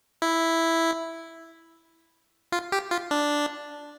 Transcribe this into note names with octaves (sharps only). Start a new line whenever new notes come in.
E4
F4
G4
F4
D4